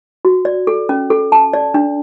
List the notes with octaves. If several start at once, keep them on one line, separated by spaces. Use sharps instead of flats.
F#4
D5
A4
C#4
A4
A5
D5
D4